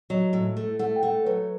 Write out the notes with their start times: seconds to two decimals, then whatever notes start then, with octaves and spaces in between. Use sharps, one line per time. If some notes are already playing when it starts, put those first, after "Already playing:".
0.10 F#3 D#5
0.33 A2
0.57 A3
0.79 A3 F#5
0.96 G5
1.03 A3 F#5
1.26 F#3 B4